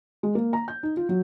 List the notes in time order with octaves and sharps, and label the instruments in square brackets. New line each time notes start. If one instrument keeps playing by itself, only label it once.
[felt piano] G#3
A#3
A#5
G6
D#4
F4
F#3